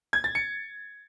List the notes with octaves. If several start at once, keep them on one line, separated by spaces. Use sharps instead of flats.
G#6
A6
C#7